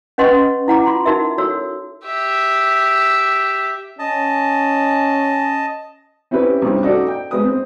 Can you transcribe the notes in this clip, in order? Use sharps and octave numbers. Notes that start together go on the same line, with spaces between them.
C#4 B4 D#5 F#5 C6 C#6
E4 F#5 A#5 D6
F4 C6
D#4 F#4 A#4 E5
F#4 A4 C#5 E6
G4 E5
C#4 D#5 A5
C4 C#4 E4 G4 B4
C2 G2
D#4 F#4 A4 D5 D#5 D6
G5
G#3 B4 D#6
C4